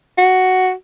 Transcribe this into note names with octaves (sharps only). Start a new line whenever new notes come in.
F#4